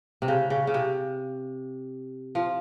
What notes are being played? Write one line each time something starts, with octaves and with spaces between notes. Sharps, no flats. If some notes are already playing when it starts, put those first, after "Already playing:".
C3
C#3
C#3
C#3
C3
F3